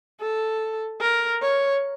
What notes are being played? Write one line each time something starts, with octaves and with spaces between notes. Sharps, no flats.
A4
A#4
C#5